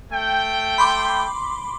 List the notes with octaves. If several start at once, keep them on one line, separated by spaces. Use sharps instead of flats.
A3 G5
B5 C6 D6